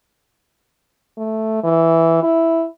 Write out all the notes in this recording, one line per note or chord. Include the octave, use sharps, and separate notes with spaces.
A3
E3
E4